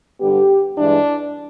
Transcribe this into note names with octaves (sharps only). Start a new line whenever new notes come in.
G2 D3 G3 B3 G4
G2 E3 G#3 D4